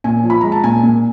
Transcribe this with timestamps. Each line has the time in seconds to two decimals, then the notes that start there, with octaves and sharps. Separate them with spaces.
0.04 A#2 G#5
0.24 F3
0.30 B5
0.41 G#3 A#5
0.52 A5
0.64 A#2 G#5
0.83 A#2